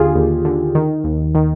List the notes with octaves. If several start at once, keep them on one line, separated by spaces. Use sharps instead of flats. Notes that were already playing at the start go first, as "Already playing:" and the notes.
Already playing: D#2 D3 F4 G4 G#4
D#2
D3
D#3
D#2
D#3